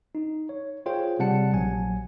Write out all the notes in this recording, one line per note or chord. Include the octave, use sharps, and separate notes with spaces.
D#4
C#5
F4 G#4 C5 C#5 G5
C3 G3 F#5 A5 C#7
A#1 F#3 G#5